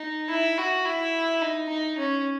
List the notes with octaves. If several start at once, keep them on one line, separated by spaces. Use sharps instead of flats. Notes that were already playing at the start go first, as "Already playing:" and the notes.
Already playing: D#4
E4
F#4
E4
D#4
D#4
C#4